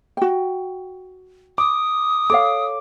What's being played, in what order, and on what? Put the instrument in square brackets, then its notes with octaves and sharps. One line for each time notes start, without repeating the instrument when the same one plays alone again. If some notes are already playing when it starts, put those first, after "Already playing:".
[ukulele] F#4 G5
[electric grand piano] D6 [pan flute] D#6
[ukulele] A4 C#5 F5 [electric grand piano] D6